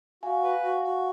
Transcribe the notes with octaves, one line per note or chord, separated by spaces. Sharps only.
F#4 F5 G#5
B4
F#4
F#4